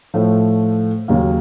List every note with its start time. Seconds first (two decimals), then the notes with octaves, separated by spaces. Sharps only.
0.14 A2 F3 A3
1.08 D#2 C#3 F#3 A#3